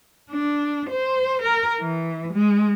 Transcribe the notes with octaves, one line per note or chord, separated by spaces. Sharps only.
D4
C5
A#4
E3
G#3